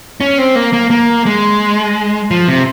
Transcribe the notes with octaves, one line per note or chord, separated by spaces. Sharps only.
C#4
C4
A#3
A#3
A#3
G#3
F3
C3